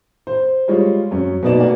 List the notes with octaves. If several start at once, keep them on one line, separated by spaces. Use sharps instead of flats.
C5
G3 G#3 F4 C#5
F#2 C#4
B2 A#3 B3 D#4 D5 E7
A3 A#3 F#4 B4 D5 G#5